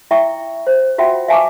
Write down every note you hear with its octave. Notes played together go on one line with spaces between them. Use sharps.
E4 E5 G5 C#6
C5
F4 F#4 E5 F#5 G5
E5 F5 G#5 A5 C#6 D6